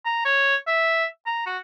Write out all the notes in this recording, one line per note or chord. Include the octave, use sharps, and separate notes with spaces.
A#5
C#5
E5
A#5
F#4